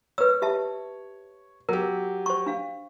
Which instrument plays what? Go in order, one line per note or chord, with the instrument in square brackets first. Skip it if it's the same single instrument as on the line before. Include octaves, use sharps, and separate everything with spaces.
[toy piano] B4 E6 [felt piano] C#5
[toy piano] G4 E5 A5
[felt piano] F#3 G4 [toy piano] A#4
[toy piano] C5 C#6
D4 F5